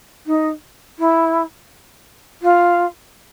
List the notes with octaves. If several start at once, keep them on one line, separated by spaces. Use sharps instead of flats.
D#4
E4
F4